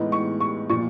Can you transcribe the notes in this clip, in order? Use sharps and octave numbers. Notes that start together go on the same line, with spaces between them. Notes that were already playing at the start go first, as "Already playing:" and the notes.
Already playing: A2 E3 G#3 B3 D#4
C#6
C#6
A#2 F3 C#6